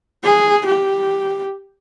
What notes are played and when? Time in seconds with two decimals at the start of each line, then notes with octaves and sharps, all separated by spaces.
0.23 G#4
0.65 G4